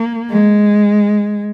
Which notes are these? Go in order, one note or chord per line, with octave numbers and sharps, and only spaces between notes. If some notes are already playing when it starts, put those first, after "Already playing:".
Already playing: A#3
G#3